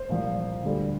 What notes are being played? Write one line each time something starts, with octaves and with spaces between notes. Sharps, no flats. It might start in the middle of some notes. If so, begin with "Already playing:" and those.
Already playing: C5
C2 A#2 F3
D2 D3 G3